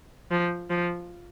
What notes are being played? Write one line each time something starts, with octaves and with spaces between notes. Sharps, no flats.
F3
F3